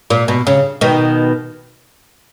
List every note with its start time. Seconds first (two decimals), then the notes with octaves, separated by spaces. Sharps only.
0.10 A#2
0.28 B2
0.47 C#3
0.81 B2 D#3